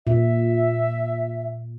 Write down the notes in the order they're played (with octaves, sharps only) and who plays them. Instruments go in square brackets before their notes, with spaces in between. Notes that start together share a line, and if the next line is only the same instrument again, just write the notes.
[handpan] A#2 [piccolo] E5